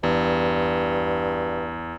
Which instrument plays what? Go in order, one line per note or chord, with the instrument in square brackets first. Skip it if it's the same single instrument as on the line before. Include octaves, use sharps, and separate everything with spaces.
[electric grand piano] E2 [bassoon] G2